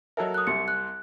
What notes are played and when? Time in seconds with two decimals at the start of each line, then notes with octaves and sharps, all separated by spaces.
0.17 F#3 A4 A#4 D#5 E5
0.34 D#6 F#6
0.47 C2 C3 C#7
0.68 F#6